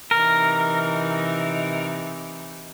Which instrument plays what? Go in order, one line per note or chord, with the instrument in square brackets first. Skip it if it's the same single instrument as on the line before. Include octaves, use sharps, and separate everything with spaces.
[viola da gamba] C3 E3 D#4 [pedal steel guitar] A#4